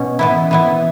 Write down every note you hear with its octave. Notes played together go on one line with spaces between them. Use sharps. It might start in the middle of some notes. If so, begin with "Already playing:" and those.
Already playing: B2 C#4
E3 B3 E4
E3 B3 E4